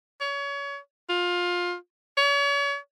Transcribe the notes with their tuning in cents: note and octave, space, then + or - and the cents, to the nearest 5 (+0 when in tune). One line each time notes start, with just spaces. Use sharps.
C#5 +30
F4 +20
C#5 +40